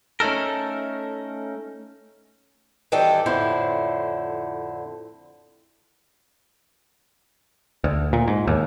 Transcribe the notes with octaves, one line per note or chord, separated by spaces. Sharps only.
A3 C#4 D#4 A4 A#4
D#3 E3 G3 D4 A4 G5
F2 A2 D3 E4 C5
D2
A#2
G#2
D#2